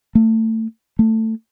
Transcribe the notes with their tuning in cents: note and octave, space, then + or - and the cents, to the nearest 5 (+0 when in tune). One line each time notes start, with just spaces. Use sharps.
A3 +25
A3 +15